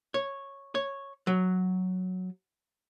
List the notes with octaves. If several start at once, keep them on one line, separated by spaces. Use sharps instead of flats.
C#5
C#5
F#3